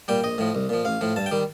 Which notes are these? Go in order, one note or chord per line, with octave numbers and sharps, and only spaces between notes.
A#2 G3 G5
A#1 D#5
A2 F3
C2
A#2 F3
A1 F5
A2 F3
G2 A5
G5
D#3 G3